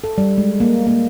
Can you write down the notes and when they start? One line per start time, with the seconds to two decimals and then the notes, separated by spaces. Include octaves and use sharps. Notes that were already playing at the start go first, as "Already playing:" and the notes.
0.04 A4
0.18 G3
0.38 G#3
0.60 A#3
0.87 A#3